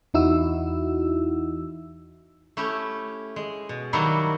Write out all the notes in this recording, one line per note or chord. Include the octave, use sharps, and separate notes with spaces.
E2 E3 D#4 E4 F#4 E6
A3 C#4 E4 G4
G#3
B2
D#3 F#3 G3 A#3 E4 F#4